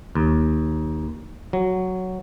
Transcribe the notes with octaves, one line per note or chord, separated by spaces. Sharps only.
D#2
F#3